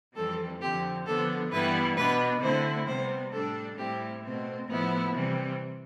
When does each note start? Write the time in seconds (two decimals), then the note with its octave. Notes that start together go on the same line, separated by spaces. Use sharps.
0.15 F2 E3 G3 C4 A4
0.60 F2 D3 F3 C4 G4
1.06 D3 F3 B3 D4 A4
1.51 G2 E3 G3 B3 E4 B4
1.96 B2 B3 D4 B4
2.41 D3 A3 C4 E4 C5
2.87 C3 G3 B3 C5
3.32 A2 G3 D4 A4
3.77 A2 G3 C4 E4 G4
4.23 B2 A3 C4
4.68 A2 F3 B3 E4
5.14 C3 E3 G3